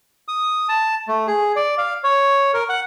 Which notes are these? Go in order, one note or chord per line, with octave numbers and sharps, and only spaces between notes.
D#6
A5
A3
G#4
D5
F5
C#5
A#4
F#5